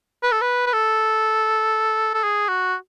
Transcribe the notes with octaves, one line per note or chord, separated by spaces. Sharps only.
B4
A4
B4
B4
A4
A4
G#4
F#4